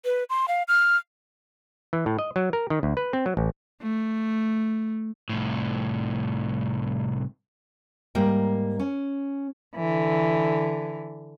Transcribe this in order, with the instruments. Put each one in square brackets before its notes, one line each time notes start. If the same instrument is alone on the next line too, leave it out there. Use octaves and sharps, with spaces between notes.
[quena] B4
C6
F5
F6
[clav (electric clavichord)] E3
A2
D#5
F#3
A#4
D#3
D2
B4
C4
F#3
A1
[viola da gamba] A3
[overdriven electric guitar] C2 A2
[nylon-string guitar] G#2 G3 A#3 G5
C#4
[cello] D3 E3